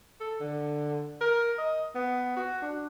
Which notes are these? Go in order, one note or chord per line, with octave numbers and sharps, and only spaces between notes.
A4
D3
A#4
D#5
B3
F#4
D4